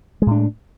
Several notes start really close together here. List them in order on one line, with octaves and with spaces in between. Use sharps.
G#3 A2 D4